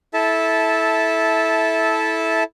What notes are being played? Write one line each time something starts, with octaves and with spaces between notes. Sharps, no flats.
E4 A4 E5 A5